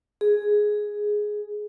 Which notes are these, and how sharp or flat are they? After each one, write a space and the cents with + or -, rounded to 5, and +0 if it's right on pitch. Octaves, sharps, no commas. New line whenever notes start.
G#4 +5